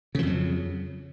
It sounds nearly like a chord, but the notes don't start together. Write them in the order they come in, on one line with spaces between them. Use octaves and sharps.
C#3 F3 F2 F#3